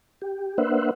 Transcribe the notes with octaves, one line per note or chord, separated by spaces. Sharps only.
G4
A#3 D4 B4 C5 E5 F#5